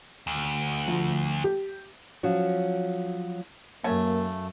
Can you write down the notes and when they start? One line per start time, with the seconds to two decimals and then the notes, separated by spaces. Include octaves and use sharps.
0.27 D2
0.88 F3
1.44 G4
2.23 F3 F#3 C#4 F#4
3.84 F#2 C#3 A3 A#3